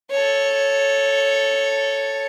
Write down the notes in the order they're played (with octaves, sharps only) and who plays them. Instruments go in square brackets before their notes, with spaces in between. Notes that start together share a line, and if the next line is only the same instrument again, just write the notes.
[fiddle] A4 C#5